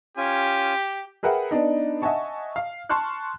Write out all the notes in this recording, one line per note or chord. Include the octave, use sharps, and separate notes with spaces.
C#4 F4 G4 G#5
G#4 A#4 B4 E5 F#5 G5
B3 D4 D#4
D#5 E5 F#5 G#5 A5 C#6
F5
A5 C6 C#6 F6 F#6